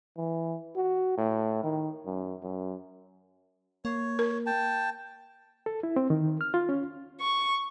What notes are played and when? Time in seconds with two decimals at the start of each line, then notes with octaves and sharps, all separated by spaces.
0.17 E3
0.76 F#4
1.18 A2
1.64 D#3
2.06 F#2
2.43 F#2
3.85 A#3 C#5
4.19 A#4
4.46 G5 A5
5.66 A4
5.83 E4
5.96 C4
6.10 D#3
6.41 F6
6.54 F4
6.69 C#4
7.21 C#6